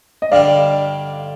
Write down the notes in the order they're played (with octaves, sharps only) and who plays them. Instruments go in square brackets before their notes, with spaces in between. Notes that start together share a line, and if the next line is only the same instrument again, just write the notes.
[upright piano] D#5
[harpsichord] G2 D3 G3 [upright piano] D5 F5